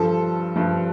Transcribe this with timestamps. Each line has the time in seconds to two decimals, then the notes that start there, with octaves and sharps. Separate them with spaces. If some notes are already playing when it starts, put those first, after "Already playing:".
Already playing: G2 F3 A4
0.56 G2 F3